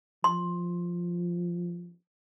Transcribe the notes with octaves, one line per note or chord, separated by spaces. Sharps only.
F3 C6